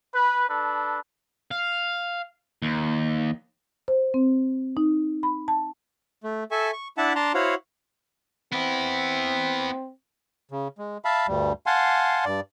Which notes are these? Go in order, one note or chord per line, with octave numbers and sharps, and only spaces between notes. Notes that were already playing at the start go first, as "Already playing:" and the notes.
B4
D4 A4 B4
F5
D#2
C5
C4
D#4
B5
A5
A3
A4 E5 G#5 C#6
C#6
D4 E4 E5 F#5 A5
D4 A5 A#5 C6
E4 F#4 C5 C#5 F5 F#5
B3 C4 E4
C#3
G#3
E5 F5 A5 B5
D2 G2 G3
F5 F#5 G#5 A5 C6
G2 D5